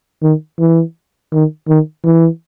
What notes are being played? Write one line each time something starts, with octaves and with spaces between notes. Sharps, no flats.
D#3
E3
D#3
D#3
E3